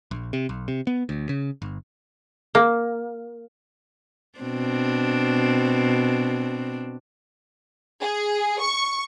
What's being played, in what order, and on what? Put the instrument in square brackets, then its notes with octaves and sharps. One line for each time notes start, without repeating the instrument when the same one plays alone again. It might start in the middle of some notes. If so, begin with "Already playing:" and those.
[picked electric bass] A#1
C3
B1
C3
B3
D2
C#3
G1
[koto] A#3
[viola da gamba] B2 C4 D4
[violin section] G#4
C#6